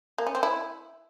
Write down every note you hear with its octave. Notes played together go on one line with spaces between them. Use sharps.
A#3
C#4
C4
E4